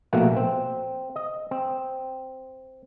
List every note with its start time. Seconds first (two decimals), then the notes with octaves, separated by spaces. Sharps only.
0.13 A#1 B2 A3 A#3 F#5
0.36 C4
1.16 D#5
1.51 C4